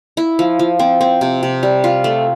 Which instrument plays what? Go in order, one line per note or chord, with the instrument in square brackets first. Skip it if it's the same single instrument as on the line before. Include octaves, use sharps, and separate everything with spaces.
[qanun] E4
F3
F3
C4
C4
C3
C3
G3
F4
A3